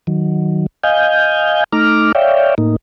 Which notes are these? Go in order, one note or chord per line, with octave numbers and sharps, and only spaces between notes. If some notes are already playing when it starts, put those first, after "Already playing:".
D#3 F#3
D#5 F5 G#5 G6
A3 D#4 A#5 D6 F6
C#5 D5 E5 F5 G5
A2 A#3 D#4